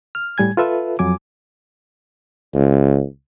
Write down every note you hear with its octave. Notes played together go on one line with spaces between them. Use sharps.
F6
A2 G3 G#5 G#6
F4 A4 B4 E5
F2 F#3 G#5 D6
C#2